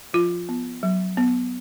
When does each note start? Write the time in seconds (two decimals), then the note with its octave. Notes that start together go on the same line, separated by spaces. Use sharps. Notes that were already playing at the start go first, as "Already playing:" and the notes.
0.13 F3 F4
0.49 B3
0.83 F#3
1.17 B3